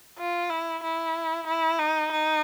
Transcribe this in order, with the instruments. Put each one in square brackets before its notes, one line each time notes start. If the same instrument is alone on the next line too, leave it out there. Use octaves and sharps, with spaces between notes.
[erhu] F4
E4
E4
E4
D#4
D#4